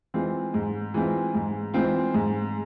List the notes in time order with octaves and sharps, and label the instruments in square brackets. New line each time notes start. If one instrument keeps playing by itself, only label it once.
[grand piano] E3 G#3 C4 F4
G#2
E3 G#3 C4 F4
G#2
E3 G#3 C4 F4
G#2